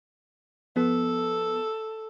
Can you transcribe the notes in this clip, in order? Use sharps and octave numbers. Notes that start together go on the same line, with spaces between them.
F3 B3 A4